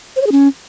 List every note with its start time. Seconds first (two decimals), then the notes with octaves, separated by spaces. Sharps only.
0.16 C5
0.21 C#5
0.27 G#4
0.32 C#4